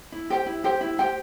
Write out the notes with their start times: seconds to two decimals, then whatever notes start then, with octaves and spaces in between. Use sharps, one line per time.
0.12 E4
0.30 G4 C5 G5
0.46 E4
0.64 G4 C5 G5
0.81 E4
0.99 G4 C5 G5